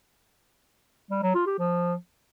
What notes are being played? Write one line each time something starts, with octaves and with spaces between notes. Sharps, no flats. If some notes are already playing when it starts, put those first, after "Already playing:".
G3
F#3
F4
G4
F3